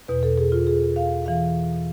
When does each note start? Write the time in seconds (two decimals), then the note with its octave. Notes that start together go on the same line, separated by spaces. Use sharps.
0.08 E2 B2 B4
0.23 A4
0.38 G#4
0.52 F4
0.67 G#4
0.96 F5
1.26 E3 F5